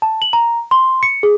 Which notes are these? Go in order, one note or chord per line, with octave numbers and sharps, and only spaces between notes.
A5
F#7
A#5
C6
C#7
G#4